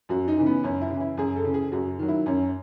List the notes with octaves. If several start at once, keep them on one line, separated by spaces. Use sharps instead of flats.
F#2 F#4
D#4
C#3 E3
B3
F#2 C#4
E4
C#3 E3
E4
F#2 G#4
A4
C#3 E3
G#4
F#2 F#4
D#3 F#3
E4
F#2 C#4